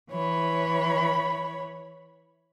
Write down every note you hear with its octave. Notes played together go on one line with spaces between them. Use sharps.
E3 C#5 B5